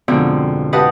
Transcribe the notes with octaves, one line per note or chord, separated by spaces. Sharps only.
F2 G#2 B2 D3 F3 C4
G4 B4 D#5 F5 F#5 A5